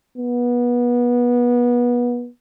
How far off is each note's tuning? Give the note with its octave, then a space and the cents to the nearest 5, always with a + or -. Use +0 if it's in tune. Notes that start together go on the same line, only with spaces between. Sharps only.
B3 -25